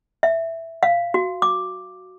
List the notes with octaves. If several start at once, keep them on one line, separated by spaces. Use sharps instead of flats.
E5
F5
F#4
D6